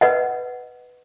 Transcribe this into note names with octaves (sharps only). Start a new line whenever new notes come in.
B4 D#5 F#5